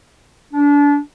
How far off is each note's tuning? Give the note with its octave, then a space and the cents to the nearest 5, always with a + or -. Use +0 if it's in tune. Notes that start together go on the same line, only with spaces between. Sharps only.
D4 -30